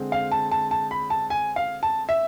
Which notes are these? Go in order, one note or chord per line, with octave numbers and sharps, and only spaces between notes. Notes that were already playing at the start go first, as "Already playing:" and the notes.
Already playing: D3 G#3 C4
F5
A5
A5
A5
B5
A5
G#5
F5
A5
E5